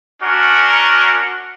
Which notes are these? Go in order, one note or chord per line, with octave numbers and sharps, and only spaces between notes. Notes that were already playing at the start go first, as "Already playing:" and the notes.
C#4 D4 F#4 A#4